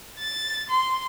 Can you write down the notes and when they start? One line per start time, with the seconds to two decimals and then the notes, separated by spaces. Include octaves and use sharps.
0.19 A6
0.70 C6